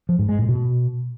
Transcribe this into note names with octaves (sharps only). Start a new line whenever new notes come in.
F3
G#2
G#3
A2
B2